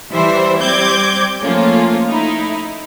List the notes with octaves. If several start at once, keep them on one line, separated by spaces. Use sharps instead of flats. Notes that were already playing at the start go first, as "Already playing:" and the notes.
E3 G3 E4 C5 E5
G3 C4 D6 G6 G#6
F3 A3 A#3 C#4 F4
A3 D#4 E4